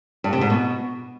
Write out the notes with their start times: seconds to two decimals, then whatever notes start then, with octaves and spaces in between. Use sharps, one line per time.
0.24 G2
0.33 C3
0.41 G#2
0.50 B2